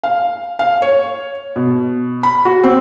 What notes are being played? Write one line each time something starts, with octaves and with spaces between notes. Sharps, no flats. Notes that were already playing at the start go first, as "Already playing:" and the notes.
F5
F5
C#5
B2
B5
F#4
C4